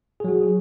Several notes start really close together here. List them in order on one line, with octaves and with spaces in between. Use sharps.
G#4 F#3 F#4